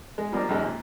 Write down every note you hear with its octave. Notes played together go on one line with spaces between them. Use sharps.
G#3
F3 G3 A#3 C4 D4 D#4
A#1 D#2 G#2 G3 G#3
A#2